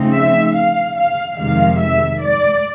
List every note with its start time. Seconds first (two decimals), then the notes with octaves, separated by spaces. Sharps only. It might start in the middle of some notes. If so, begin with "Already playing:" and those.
Already playing: C#3 F3 A3 C4 D#4
0.13 E5
0.55 F5
0.96 F5
1.38 F2 C3 D#3 G#3 F5
1.79 E5
2.21 D5